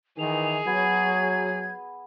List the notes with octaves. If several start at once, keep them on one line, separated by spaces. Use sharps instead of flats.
D#3 E3 G#4 F7
F#3 B3 G#6